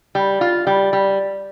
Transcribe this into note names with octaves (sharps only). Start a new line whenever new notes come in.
G3
F4
G3
G3